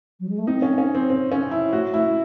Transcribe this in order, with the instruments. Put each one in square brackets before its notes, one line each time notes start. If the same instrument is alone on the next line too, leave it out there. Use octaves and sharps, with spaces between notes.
[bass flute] F#3
G#3
A3
[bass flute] C4 [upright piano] D#4
[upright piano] C#4
C#4
C4
C4
C#4
E4
[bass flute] A3 [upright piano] F#4
[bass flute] A3 [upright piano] E4